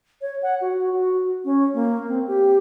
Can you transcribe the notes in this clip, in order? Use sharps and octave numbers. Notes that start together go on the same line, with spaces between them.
C#5
F#5
F#4
F#4
C#4
A#3
C4
G4